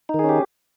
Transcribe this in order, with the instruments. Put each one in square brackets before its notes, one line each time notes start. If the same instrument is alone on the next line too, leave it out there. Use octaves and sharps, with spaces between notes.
[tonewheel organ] D#4
D#3
G#4
C#4
G4